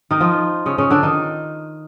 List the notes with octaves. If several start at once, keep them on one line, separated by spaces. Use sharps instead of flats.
D#3 D#4
F3 F4
C#3 C#4
C#3 C#4
D3 D4
D#3 D#4